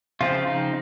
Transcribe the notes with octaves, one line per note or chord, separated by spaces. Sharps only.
C#3 F3 C4 F4
D#4